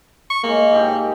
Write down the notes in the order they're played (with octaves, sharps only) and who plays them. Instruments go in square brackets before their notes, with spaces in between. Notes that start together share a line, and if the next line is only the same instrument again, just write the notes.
[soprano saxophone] C#6
[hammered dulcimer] G#3 [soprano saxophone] A#3
[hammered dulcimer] G#2 G4